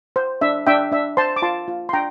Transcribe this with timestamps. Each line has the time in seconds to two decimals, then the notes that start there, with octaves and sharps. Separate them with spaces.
0.16 C5
0.41 D4 E5
0.67 D4 E5 G5
0.92 D4 E5
1.17 C5 A5 C6
1.36 D6
1.42 F4 A5 C6
1.68 F4
1.89 C6
1.93 D4 G5 A#5